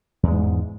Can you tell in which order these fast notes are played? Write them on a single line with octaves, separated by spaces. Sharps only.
E2 G#3 G#2